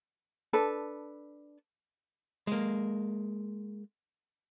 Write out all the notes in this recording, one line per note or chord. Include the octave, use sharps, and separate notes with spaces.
D4 A4 B4
G#3 A#3